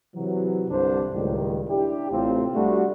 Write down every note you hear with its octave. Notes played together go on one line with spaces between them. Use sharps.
C3 E3 F#3
C2 G2 D3 D4 C5
C#2 A2 D#3 G3
D4 E4 G4
A1 A2 C3 C4 F4
G3 A3 D4 F#4